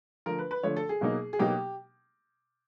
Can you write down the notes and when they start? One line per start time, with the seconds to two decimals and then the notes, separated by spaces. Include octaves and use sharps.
0.26 D3 F3 A3 A#4
0.39 B4
0.51 B4
0.63 D3 F3 A3 C#5
0.77 A4
0.89 G#4
1.01 B2 F#3 A#3 D#4
1.33 G#4
1.39 B2 F#3 A#3 D#4 G4